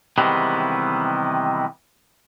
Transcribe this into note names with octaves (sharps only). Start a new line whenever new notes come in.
C3 D#3 E3 G3 G#3 B3